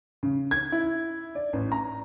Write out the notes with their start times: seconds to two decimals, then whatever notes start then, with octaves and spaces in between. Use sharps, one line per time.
0.23 C#3
0.51 G#6
0.72 E4
1.35 D5
1.53 A1
1.72 A#5